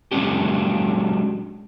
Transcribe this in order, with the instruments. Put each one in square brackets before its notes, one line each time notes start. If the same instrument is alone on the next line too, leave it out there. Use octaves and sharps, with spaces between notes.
[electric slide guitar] F#3 G#3 C#4 D4 G4